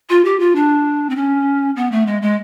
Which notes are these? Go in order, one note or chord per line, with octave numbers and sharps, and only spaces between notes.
F4
G4
F4
D4
C4
C#4
B3
A3
G#3
G#3